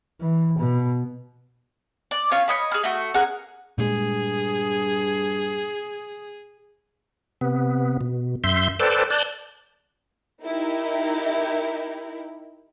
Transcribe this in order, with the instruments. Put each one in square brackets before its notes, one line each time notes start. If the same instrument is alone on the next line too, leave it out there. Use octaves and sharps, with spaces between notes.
[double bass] E3
B2
[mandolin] D5
C#4 F4 C#5
C#5 D#5 B5
G#4 F6
A3 F#4
C#4 G#4 A#4 F#5
[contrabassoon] G2 [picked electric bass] A#2 G#3 [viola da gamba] G#4
[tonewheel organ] C3 B3
B2
F#2 E5 C6 G6
A4 B4 C5 D5 G5 A5
D5 A5 F#6 G6
[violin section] D#4 E4 G4 A#4